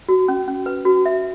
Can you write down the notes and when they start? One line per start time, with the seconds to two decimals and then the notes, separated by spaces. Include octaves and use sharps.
0.08 F#4
0.28 C#4
0.48 C#4
0.66 B4
0.85 F#4
1.06 E5